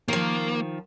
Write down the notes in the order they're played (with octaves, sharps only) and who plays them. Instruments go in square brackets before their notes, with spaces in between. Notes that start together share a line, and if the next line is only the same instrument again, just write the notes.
[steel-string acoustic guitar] D#3 F3 [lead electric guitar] A#3